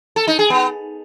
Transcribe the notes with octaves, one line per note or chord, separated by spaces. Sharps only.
A4
D#4
G#4
B3